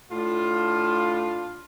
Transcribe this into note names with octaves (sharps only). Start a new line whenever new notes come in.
A2 D4 F4